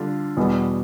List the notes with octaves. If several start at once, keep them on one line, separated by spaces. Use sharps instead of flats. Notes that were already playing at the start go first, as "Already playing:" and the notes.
Already playing: D3 G3 D4 F4
E2 B2 G3 B3